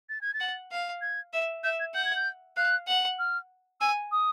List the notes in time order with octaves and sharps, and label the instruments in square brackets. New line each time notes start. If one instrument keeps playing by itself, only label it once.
[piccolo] A6
G#6
A6
[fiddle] F#5
F5
[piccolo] G#6
[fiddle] E5
[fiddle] E5 [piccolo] G6
[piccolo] G#6
[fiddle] F#5 [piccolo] G6
[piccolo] G#6
G6
[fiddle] F5 [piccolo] F#6
[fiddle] F#5
[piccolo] F6
[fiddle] G#5 [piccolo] E6
[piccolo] D#6